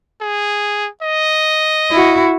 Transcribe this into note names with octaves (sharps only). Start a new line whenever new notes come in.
G#4
D#5
E4 F#4